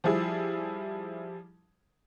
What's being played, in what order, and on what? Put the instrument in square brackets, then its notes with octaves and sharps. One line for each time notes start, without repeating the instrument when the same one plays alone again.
[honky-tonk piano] F3 G3 E4 G#4